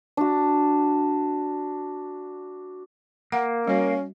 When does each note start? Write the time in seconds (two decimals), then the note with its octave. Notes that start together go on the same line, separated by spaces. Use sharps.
0.17 D4 F#4
3.32 A#3 F#5
3.67 G3 C#4 F#4